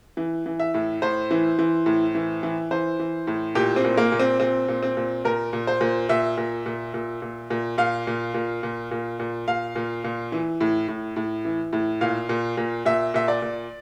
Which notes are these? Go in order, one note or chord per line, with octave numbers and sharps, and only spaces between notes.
E3
E3
E5
A2
A2 C5
E3
E3
A2
E3
E3
E3 C5
E3
A2
A#2 G4
C4
A#2
A#3
A#2
C4
A#2 C4
A#2
C4
A#2
A#2 A#4
A#2
C5
A#2
A#2 E5
A#2
A#2
A#2
A#2
A#2
A#2 F5
A#2
A#2
A#2
A#2
A#2
A#2 F5
A#2
A#2
E3
A2
A2
A2
E3
A2
A#2 F5
A#2
A#2
A#2 E5
A#2 E5
D5
A#2